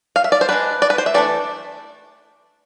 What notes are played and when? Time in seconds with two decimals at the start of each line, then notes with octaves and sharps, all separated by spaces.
0.16 F5
0.24 E5
0.32 D5
0.41 C5
0.49 G#3 D4 B4
0.82 D5
0.90 B4
0.98 C5
1.06 E5
1.14 E3 A3 D4 D5